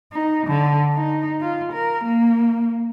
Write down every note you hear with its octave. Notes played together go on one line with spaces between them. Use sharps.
D#4
D3
D#4
F4
A#4
A#3